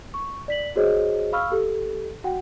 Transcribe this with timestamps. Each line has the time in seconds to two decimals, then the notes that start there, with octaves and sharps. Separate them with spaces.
0.14 C#6
0.48 D5 B6 F#7
0.76 F#4 G#4 C5 C#5 D#5
1.33 F5 B5 C#6 E6 F6
1.52 G4 A4
2.24 F#4 F#5 G5